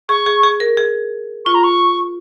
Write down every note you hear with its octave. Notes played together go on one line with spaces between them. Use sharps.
G#4 C#6
G#4
G#4
A#4
G#4
F4 C#6
A#5
C#6